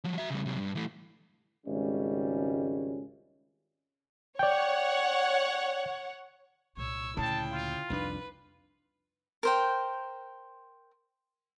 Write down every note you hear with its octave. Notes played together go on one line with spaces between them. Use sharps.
F3 F#3
F#4 E5
C#3 G3
C3 F#3
G2
E3 A3
G#1 C#2 G3 C#4
C#5 D5 F#5 G5
C2 A#2 C#5 E6
D2 A#2 C#3 E4 G5 A5
F4
C2 F2 D4 D#4 B4
A#4 C5 G5